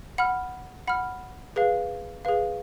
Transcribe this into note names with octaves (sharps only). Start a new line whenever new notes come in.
F#5 B5 F6
F#5 B5 F6
G#4 B4 F5
G#4 B4 F5